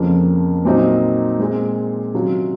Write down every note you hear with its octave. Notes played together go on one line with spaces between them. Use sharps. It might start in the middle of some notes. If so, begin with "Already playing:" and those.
Already playing: F2 C#3 F3 A#3 C#4
A#2 F#3 C4 D#4
A#2 G#3 C4
C3 D#3 F#3 C#4 F4